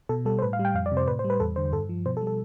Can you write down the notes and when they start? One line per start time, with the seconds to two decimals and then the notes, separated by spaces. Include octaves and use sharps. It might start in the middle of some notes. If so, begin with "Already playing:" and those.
0.09 B2 A4
0.25 G3 A4
0.39 C5
0.42 A2 B4
0.53 F5
0.59 G3
0.65 G5
0.74 F2 F5
0.86 D5
0.91 C3
0.97 C5
1.07 A2 B4
1.19 C5
1.24 G3
1.30 B4
1.40 E2 A4
1.56 D3 C5
1.72 G2 A4
1.89 F3
2.06 B2 C5
2.17 A4
2.21 G3
2.27 A4